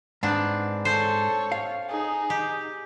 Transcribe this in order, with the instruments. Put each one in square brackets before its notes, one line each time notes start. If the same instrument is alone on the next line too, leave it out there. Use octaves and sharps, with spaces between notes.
[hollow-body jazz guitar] G#2 [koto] B3 C4 D4
[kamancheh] A4 C#5 [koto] C5
[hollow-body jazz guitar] F5
[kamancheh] D#4 G#4
[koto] G4